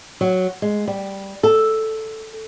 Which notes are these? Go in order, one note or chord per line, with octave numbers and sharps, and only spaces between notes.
F#3
G#3
G3
A4